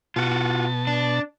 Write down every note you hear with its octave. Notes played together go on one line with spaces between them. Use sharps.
B2 F4 F#4 A5
D4